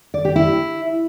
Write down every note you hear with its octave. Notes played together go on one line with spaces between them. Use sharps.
D5
G4
E4